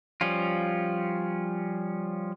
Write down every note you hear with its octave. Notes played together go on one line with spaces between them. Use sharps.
F3 G3 C#4 F4